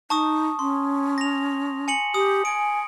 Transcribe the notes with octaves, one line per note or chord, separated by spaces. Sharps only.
D#4 A5 C#6 D#6
C#4 C6
A#6 F7
G#5 C#7 F#7
G4 D#6
G#5 D7